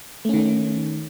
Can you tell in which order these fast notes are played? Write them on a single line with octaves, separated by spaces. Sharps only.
A3 C#4 D#3